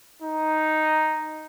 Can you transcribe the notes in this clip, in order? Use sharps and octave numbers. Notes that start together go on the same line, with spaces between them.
D#4